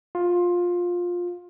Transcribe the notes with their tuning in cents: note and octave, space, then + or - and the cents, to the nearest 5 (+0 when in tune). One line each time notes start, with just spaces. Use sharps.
F4 +15